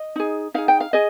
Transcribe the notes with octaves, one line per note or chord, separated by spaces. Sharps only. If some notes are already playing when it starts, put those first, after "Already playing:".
Already playing: D#5
D#4 G#4
D#4 G#4 F5
G5
F5
G#4 D#5